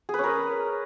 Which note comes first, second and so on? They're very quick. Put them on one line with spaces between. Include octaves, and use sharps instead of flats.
G#4 B4 C#4 A#4